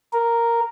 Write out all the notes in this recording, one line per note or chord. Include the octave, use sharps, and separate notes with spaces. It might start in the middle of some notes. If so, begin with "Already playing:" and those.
A#4